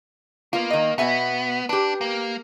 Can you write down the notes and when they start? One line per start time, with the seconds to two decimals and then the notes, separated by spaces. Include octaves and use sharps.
0.53 A#3 B3 F4
0.70 D#3 D#5
0.98 B2 B3 E5 G#5
1.69 D4 G4 B4
2.01 A#3